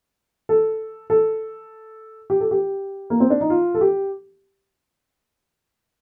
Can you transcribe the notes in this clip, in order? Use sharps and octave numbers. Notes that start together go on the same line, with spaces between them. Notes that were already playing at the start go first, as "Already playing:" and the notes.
A4
A4
G4
A4
G4
A#3
C4
D4
D#4
F4
A4
G4